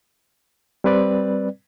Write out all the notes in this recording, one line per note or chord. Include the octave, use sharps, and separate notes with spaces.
G3 C4 B4 D5